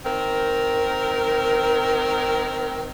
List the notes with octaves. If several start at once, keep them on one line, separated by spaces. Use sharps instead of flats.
D#3 C4 A#4